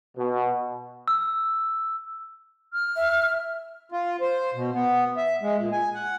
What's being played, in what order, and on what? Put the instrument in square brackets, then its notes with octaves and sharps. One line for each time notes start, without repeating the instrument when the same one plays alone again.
[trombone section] B2
[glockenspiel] E6
[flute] F6
[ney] E5
[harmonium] F4
C5
B2
B3
E5
G#3
A#2
G#5
F#5